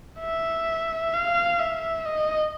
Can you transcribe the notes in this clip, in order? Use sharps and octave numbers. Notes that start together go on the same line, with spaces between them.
E5
F5
E5
D#5